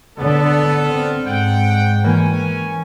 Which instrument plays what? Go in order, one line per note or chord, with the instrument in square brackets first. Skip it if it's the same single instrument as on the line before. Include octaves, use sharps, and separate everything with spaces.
[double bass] D3 D4 [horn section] B3 A4
[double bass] D3 C4 [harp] F6
[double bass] G#2 [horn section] F#5 G5
[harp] E3 A#3 [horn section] C#4 G#5